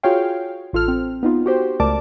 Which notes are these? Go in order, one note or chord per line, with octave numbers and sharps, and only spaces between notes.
F4 F#4 G#4 C#5 F5 G5
A1 F4 A4 F6
C4
B3 D#4 F4
F#4 G4 C5
C#2 A3 A#4 D5 A5 D6